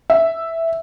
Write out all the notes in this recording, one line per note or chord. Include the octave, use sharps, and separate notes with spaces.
E5